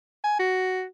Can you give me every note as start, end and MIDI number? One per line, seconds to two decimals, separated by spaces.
0.24 0.39 80
0.39 0.84 66